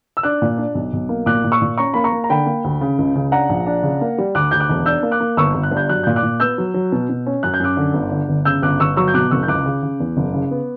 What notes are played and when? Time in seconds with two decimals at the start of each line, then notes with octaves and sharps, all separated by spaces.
0.17 E6
0.23 D4 D6 F#6
0.42 A#2
0.58 D4
0.75 B1
0.93 B1
1.09 A#3
1.26 A#2 D6 F#6
1.44 A#2
1.52 C#6 E6
1.62 A#2
1.77 C#4 A#5 C#6
1.94 A#3 B5
2.04 A#5 C#6
2.12 A#3
2.24 A#5
2.30 D3 G5 B5
2.46 A#3
2.64 D2
2.81 C#3
2.99 C#2
3.16 C#3
3.32 D4 F#5 A#5
3.49 A#1
3.67 D4
3.83 C#3
4.01 A#3
4.18 G3
4.35 D2 D6 F#6
4.51 D2 G6
4.60 D6 F#6
4.69 E1
4.86 D4 E6 G6
5.03 A#3
5.11 D6 F#6
5.20 A#3
5.37 G1 C#6 E6
5.55 G1
5.63 F#6
5.71 G2
5.77 G6
5.89 F#3 F#6
6.03 A#2 G6
6.16 D6 F#6
6.23 A#2
6.40 B3 E6 G6
6.58 F#3
6.74 F#3
6.92 B2
7.09 B2
7.26 C#4
7.43 F#2 F#6
7.54 G6
7.60 F#2 D6 F#6
7.77 D3
7.94 G1
8.12 D3
8.29 G1
8.45 C#3 E6 G6
8.62 G1 D6 F#6
8.80 G1 C#6 E6
8.96 F#3 C#6 E6
9.08 G6
9.14 B2 D6 F#6
9.31 F#1 C#6 E6
9.43 G6
9.48 C#2 D6 F#6
9.66 C#3
9.83 C#3
10.00 E2
10.17 F#1
10.34 C#3
10.51 B3